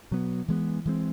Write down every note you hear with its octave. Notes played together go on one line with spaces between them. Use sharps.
B2 F#3 B3
E3 G#3 B3
E3 G#3 C4